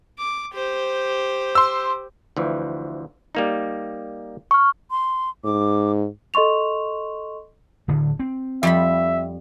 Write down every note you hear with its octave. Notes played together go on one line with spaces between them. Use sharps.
D6
G4 C5
C6 E6
D2 E3 F3
G3 A#3 D#4
C#6 F6
C6
G#2 D6
A4 D#5 C6 C#6 F7
D1 D2 D3
C4
F2 G3 E5 B5